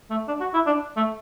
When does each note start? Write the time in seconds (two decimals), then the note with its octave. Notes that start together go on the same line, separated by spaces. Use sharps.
0.10 A3
0.28 D4
0.40 F#4
0.54 E4
0.66 D4
0.96 A3